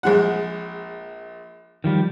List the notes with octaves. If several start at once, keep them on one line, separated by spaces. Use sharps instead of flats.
A#1 G#3 F#5
D#3 F3 G3